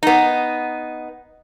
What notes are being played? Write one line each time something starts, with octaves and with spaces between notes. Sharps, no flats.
B3 D#4